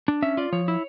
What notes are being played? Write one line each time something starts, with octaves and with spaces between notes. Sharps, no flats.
D4
C#4 E5
F4 D5
F3 C#5
E4